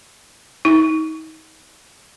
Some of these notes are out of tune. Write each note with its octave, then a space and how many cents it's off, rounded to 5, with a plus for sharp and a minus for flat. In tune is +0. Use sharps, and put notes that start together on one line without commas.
D#4 +30